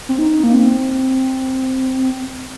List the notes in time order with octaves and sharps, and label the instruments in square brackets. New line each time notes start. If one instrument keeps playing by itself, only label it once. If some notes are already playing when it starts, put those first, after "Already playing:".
[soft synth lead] C4
D#4
A#3
C4